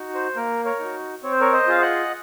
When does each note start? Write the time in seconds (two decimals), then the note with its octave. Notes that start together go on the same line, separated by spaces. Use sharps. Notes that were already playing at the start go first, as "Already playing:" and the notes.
Already playing: D#4 F#4
0.15 C5
0.36 A#3 A#4
0.65 A#4 C#5
0.79 D#4 F#4
1.23 C4 C#5
1.31 C5
1.41 A#4 C#5
1.53 C5 D#5
1.68 F4 G#4 F5
1.82 D#5 F#5